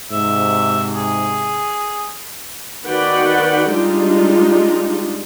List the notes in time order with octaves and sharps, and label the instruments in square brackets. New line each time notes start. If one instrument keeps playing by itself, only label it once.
[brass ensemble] G#2 C3 [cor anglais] E5
[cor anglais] G#4
[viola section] D#3 F#4 B4 D5 F#5 G5
G3 G#3 D4 D#4 F4